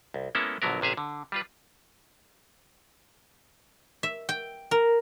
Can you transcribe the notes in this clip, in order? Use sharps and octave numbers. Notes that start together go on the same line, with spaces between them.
C2
G#3 A#3 B3 C#4 E4 A4
A#1 D3 F#3 B3 A#4
A1 C3 G#4 E5 F5
D3
G3 F4 B4
E5
G5
A#4